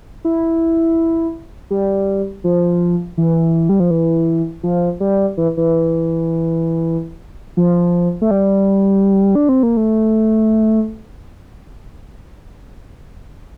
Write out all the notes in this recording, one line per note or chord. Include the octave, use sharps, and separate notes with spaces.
E4
G3
F3
E3
G3
F3
E3
F3
G3
E3
E3
F3
A3
G3
D4
C4
A#3
A3